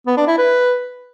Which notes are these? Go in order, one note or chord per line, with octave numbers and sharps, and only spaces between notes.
B3
D4
E4
B4